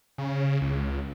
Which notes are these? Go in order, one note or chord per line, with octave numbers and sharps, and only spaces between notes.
C#3
C#2